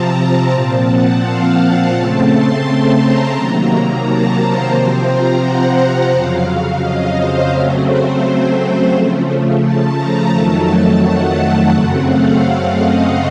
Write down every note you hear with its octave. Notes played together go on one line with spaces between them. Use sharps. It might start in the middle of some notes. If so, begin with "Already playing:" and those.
Already playing: C3 F3 C4 A5 A#5
A#2 F3 C4 A5
F#5
F5
A5
C#3 A3 C4
C6
A#5
C3 D#3 F#3 A#3 A#5
A5
C5
C3 F3 C4
A#5
F#5
F2 C#3 F#3 F5
F5
D#5
C5
C#3 F#3 A3 C4
C5
C#3 F3 A3
A5
A#5
F2 D#3 F#3 A3 A5
F#5
F#2 C#3 A3 C4
F5
D#5